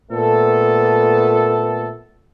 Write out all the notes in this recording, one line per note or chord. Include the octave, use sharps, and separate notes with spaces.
A#2 A3 B3 A4